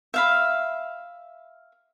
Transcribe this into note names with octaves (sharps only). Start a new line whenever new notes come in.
E5 F5 B5